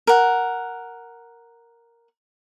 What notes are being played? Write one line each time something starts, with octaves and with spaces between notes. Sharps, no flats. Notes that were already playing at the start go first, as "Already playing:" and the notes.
A#4 F#5